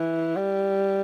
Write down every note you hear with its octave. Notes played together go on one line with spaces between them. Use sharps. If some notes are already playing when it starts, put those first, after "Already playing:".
Already playing: E3
G3